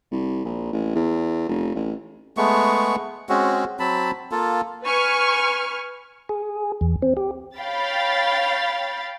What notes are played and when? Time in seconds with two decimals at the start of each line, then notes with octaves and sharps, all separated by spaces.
0.11 C2
0.45 A#1
0.73 A1
0.95 E2
1.49 F1
1.75 A1
2.37 G#3 A3 B3 C#6
3.29 G#3 C4 C#4 F#4
3.80 F#3 C4 A5 B5
4.32 A#3 F4 A4
4.84 B4 G#5 C#6 F6
6.29 G#4
6.81 E2
7.02 C4
7.17 G4
7.58 C#5 F5 G5 B5 A6